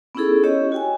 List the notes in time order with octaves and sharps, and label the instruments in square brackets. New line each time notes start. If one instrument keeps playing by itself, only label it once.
[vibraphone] B3 C#4 D#4 E4 G#4 A4
C#4 G4 C#5 D#5
F#4 G5 G#5